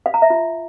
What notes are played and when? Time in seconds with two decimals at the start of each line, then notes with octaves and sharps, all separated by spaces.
0.06 F5
0.14 A#5
0.22 E5
0.30 F4